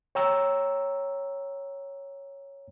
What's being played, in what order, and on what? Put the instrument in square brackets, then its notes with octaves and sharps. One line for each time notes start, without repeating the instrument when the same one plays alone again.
[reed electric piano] C#5 G5 A#5 E6